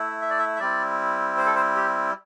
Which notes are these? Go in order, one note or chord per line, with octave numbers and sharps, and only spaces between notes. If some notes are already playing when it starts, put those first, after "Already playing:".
Already playing: A3 E4
E5
D5
E5
E5
G3 C4 E4 D5
C5
A4
C5
G4